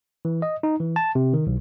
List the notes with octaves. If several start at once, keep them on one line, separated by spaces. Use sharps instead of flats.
E3
D#5
D#4
E3
A5
C3
D#3
B1